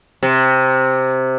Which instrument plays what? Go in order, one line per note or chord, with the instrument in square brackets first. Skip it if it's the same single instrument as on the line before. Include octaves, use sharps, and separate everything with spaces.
[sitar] C3